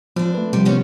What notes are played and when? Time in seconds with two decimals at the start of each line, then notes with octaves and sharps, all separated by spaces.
0.16 F3 C4 D4
0.34 A3 B4
0.53 C3 F3 G3
0.65 D#3 B3 C#4